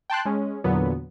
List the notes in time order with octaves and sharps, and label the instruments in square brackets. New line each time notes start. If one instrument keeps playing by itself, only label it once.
[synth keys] G5 A5 C6 F#6
G#3 C#4
E2 A#2 D3 F#3 B3